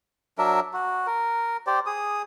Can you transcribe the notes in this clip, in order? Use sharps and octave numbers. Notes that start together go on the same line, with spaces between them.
F#3 D4 A#4 E5
F#4
A#4
G4 C5 D5
G#4 D#6